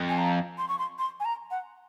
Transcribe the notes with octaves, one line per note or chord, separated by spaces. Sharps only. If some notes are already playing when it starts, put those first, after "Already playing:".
Already playing: F2
G#5
A#5
C6
C#6
C6
C6
G#5
A#5
F#5